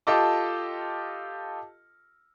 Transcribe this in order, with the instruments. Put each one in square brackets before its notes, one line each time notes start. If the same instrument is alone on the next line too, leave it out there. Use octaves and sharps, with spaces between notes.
[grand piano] F4 G4 A4 D#5 A5 D6